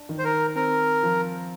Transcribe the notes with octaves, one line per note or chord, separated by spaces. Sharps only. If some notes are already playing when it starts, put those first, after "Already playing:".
Already playing: D4
D#3
C5
A#4
C4 A#4
F3